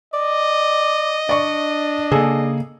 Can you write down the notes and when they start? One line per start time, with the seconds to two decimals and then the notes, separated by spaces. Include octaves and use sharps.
0.14 D5 D#5
1.29 D4 D5 C#6
2.12 C#3 A#3 G#4 A4